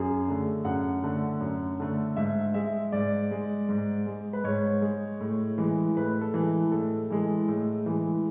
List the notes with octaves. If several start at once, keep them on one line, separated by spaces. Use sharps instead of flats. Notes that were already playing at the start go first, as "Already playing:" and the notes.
Already playing: F#2 G#4
D3 A3
F#2 F#5
D3 A3
F#2
D3 A3
G#2 E5
G#3 E5
G#2 D5
G#3
G#2
G#3
B4
G#2 C#5
G#3
A2
E3 G#3
A2 B4
A4
E3 G#3
A2 A4
E3 G#3
A2
E3 G#3